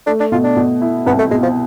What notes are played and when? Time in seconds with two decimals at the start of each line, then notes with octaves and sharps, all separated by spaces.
0.07 A3 D4
0.20 D4
0.32 B2 F4
0.44 D4
0.56 B2
0.81 E4
1.06 C2 B3
1.19 A3
1.31 B2 G#3
1.43 F3